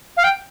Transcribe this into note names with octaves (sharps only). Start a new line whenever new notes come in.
F5
G5